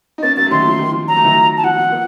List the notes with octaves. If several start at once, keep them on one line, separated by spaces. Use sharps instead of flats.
D#4
A#3 C#4 A6
F#3 A#3 A6
A3
D#3 F#3 C6
F3
D#3
F3
F#3 A#5
A3
D#3 F#3
A5
F3 F#5
F3
A#3